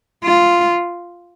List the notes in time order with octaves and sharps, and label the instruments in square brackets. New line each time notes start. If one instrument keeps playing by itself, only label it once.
[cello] F4